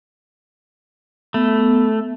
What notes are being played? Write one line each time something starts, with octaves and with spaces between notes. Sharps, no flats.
A3 B3